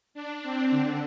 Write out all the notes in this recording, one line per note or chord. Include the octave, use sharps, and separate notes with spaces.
D4
C4
D3